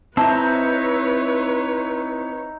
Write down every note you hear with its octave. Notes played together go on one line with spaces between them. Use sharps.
C4 D#4 E4 B4 C#5 E5 A5 A#5